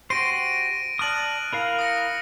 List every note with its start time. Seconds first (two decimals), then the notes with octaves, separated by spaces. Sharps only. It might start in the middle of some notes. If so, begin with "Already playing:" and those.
0.10 F#4 G4 C5 A#6 D7 D#7
0.99 D5 A5 D#6 F6 F#6 F#7
1.53 E4 A#4 F5
1.79 D#6 A#6 C#7